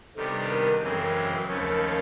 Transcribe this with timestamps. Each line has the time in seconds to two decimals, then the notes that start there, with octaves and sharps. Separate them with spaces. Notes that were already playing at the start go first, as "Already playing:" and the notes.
0.15 C3 D#3 G3 B3 D4 A4
0.49 A#4
0.82 F#2 C#3 E3 G#3 C4 A#4
0.90 A4
0.99 A#4
1.48 D#2 C#3 F3 A3 C#4